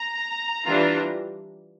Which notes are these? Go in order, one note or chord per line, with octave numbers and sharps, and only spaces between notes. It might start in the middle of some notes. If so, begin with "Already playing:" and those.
Already playing: A#5
E3 G3 D4 F4